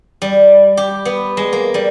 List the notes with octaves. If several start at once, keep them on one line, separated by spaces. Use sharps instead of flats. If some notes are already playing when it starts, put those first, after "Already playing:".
G3
G4
B3
G#3
A#3
G3